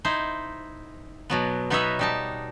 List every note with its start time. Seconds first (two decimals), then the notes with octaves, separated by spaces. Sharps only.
0.05 D#4 E4 C5
1.30 B2 F#3 B3
1.70 B3 D#4 B4 C#5 D#5 E5
1.99 G3 D#4 A5